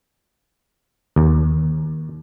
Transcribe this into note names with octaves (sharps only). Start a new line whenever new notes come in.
D#2